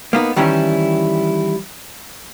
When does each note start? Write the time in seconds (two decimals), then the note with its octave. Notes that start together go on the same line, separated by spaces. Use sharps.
0.13 A#3 B3 D#4
0.36 D#3 E3 G3 C#4 E4